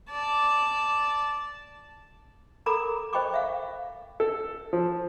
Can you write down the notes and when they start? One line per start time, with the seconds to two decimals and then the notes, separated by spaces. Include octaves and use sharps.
0.10 D5 A5
2.66 A4 A#4 A#5 B5 D6
3.13 C5 D#5 G5 B5 C#6 D6
3.34 E5 F5
4.20 A4
4.73 F3